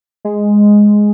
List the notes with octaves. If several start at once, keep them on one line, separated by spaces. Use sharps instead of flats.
G#3